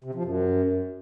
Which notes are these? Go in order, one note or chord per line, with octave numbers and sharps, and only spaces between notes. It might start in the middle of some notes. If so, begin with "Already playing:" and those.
C3
F3
F#2